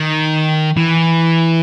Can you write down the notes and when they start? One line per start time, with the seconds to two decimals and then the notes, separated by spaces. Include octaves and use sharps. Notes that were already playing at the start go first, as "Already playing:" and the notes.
Already playing: D#3
0.77 E3